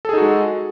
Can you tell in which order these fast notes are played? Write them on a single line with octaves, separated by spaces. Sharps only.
A4 G#4 D#4 F#4 G#3